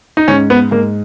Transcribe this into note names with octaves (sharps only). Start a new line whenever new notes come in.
D#4
G#2 C#4
B3
G#2 A#3